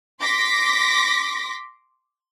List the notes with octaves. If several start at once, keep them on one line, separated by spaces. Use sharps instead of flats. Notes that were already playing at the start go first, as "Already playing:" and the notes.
C6 D6 A#6 B6